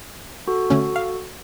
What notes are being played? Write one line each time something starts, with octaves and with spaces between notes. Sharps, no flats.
F#4 A4
D3 A3 C#4
F5